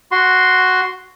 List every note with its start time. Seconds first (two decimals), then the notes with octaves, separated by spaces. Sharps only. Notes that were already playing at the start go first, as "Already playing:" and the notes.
0.12 F#4 C6